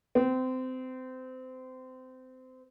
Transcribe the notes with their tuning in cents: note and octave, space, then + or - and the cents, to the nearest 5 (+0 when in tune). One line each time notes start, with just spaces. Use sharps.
C4 -25